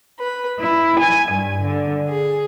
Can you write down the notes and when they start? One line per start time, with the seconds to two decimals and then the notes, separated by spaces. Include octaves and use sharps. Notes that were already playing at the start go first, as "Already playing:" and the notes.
0.19 B4
0.60 E4
1.00 G#5
1.32 G2
1.63 D3
2.08 G#4